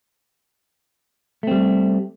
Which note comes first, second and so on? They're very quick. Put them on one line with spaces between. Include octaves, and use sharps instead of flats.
A3 C4 G3